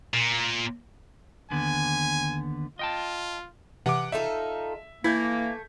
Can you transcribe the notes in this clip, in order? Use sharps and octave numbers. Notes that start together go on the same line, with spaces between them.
A#2
D#2 D3 B3 G#5
F4 D#5 G5 A5
C3 E3 F#5 D6
D#4 F4 A4 E5
E3 A3 A#3 E4 G6 G#6 B6